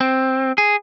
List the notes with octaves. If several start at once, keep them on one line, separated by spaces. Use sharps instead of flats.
C4
G#4